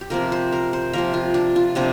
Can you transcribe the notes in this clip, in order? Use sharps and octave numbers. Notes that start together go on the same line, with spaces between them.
G4
C3 F3 A#3 A#4
C5
A#4
C5
C3 F3 A#3 A#4
F4
D4
F4
C3 F3 A#3 D4